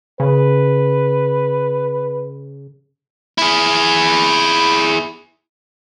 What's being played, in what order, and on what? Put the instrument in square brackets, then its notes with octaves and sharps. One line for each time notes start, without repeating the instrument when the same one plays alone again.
[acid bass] C#3 [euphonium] B4
[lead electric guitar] E4 G#4